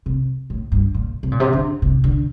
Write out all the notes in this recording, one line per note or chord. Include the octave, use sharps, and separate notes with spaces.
C3
A2
G2
A#2
C3
A#2
C3
D3
C3
D3